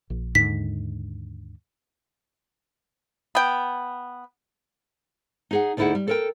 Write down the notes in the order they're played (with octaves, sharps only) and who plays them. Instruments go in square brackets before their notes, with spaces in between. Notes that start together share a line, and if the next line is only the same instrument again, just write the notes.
[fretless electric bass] A#1
[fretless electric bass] D#2 G#2 D3 [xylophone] B6
[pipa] B3 G5
[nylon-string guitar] D#4 G#4 F#5
D2 D3 D#4 E4 G#4 F#5
G3
A4 A#4 G5